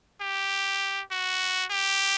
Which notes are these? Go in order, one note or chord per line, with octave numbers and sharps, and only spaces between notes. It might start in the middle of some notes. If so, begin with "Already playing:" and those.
G4
F#4
G4